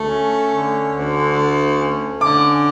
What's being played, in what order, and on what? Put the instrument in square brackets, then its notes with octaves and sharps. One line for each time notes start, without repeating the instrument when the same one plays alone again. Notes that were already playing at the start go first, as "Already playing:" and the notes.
Already playing: [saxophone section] D2 A3
C#4
D3
D2
A3
C#4
[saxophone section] D3 [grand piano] D6